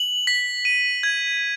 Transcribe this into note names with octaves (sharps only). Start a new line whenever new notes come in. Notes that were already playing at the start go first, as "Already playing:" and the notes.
Already playing: F#7
B6
D#7
G#6